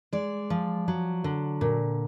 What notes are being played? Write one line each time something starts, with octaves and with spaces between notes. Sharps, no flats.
G#3 D5
F3
F#3
D3
A#2